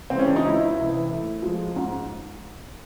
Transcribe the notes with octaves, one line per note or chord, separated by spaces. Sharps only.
C#3 E3 G#3 C4
C#4
D4
D#4
C#2 E4
C3 E3
A2
F3 G#3
G#2